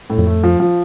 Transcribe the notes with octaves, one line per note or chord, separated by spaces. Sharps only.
A2
F2
A3
F3
F3